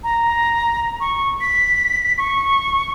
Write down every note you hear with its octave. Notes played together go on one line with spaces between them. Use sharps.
A#5
C#6
B6
C#6